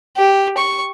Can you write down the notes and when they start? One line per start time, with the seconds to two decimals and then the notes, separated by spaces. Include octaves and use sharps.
0.17 G4
0.57 C#6